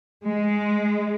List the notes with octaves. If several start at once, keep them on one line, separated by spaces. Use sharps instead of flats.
G#3